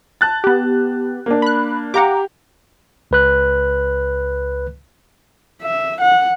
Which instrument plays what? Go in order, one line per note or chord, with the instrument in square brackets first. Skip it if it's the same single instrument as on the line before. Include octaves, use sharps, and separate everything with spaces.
[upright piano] A5 F#6 A6
[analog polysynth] B3 G4
[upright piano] A#3 D4
[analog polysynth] B5 F#6
[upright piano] G4 F5 [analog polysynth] F#5 A#5 D6
[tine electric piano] C#2 B4 F#6
[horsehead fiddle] E5
F#5